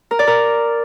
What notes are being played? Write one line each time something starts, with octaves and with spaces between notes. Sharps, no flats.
A#4
D5
A#4